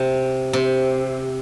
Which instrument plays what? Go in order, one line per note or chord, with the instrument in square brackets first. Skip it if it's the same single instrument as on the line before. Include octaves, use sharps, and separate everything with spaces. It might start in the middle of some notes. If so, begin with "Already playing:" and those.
Already playing: [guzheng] C3
C3